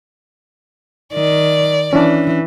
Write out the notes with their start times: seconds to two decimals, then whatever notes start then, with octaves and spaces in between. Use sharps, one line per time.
1.13 D#3 D5
1.93 E3 C#4 D4